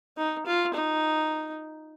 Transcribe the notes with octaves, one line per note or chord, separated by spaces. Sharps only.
D#4
F4
D#4